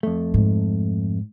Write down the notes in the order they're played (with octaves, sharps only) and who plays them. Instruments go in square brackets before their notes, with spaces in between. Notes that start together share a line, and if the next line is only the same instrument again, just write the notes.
[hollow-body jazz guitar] F2 A3
[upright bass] G#2